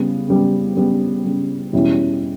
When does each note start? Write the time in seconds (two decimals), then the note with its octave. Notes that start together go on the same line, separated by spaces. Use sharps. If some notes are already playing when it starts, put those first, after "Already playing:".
Already playing: C#3 G3 B3
0.28 C#3 G3 B3
0.76 C#3 G3 B3
1.25 C#3 G3 B3
1.73 E2 B2 G3 C#4 E4